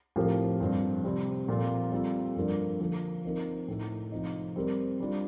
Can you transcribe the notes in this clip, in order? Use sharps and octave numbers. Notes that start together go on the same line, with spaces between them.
A2 F3 C4 G4 A#4
G2 F3 C4
C3 G3 C4
A#2 F3 C4 F4 A4
G3 C4 F4 A4
G2 F3 A#3 D4 A4
D3 F3 A#3
F3 C4 D#4 A#4
A2 A3 D#4 A4
C3 F3 C4 D#4
G3 C4 G4 A#4
G3 D4 F4